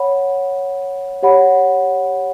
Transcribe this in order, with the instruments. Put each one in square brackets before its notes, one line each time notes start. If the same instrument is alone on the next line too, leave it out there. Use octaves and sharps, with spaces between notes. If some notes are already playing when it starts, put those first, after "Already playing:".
Already playing: [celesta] C#5 F#5 B5
G4 C#5 F#5 B5